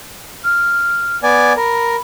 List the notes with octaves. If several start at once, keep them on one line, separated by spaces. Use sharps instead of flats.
F6
B3 D5 G#5
A#4 B5